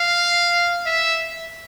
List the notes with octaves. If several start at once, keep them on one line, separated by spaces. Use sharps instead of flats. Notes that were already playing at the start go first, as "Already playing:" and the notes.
Already playing: F5
E5